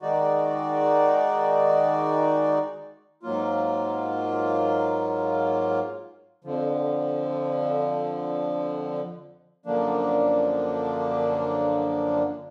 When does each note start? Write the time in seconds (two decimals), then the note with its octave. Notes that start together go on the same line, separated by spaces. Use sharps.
0.01 D#3 G#3 D#4 F#4 D5
3.23 G#2 F#3 A#3 F4
6.44 F2 D3 F3
9.66 F#2 D3 F3 A#3 D4